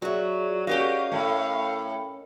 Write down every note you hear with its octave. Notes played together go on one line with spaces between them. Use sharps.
F#3 F#4 G#4 D5 E5
C#4 F#4 G4 A#4 D#5 F5
A2 A3 G5 B5